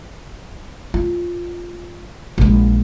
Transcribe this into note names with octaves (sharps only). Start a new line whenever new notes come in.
F4
A#1 G#3